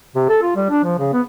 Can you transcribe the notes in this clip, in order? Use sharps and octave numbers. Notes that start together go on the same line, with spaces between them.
C3
A4
F4
G3
D4
F3
C#3
B3